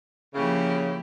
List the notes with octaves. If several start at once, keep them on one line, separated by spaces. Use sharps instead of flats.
C#3 F3 A#3 E4 G4